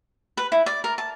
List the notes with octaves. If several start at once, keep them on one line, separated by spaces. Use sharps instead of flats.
B4
E4
D5
A#4
A5